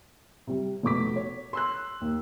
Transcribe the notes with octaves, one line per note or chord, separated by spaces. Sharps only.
C3 G3
F1 B2 D6 B6
C#5
C6 E6 F#6
D#2